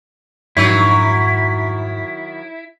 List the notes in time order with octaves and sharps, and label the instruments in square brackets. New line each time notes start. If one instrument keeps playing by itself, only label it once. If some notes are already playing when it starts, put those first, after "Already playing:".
[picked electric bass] F2 G#2 D4 [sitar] D#3 F#3 [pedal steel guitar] E4